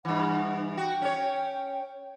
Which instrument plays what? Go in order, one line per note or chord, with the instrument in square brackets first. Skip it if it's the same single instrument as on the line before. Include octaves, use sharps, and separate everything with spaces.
[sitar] G2 E3 [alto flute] F#5
[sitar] F#4 [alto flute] G5
[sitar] C#4 C#5